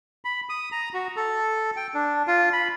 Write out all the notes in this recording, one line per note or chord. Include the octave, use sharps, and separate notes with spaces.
B5
D#6
A#5
F#4
A4
G5
D4
F4
B5